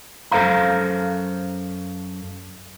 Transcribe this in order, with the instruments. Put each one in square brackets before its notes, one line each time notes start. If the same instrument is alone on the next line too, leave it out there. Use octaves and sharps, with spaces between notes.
[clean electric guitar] F#2 A4 C5 F5 A#5